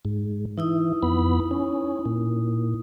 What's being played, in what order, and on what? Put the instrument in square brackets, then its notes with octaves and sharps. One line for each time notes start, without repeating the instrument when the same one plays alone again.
[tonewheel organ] G#2
[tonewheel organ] E3 [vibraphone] D#4 E4 D#6
[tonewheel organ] F2 B3 B5
C#4
A#2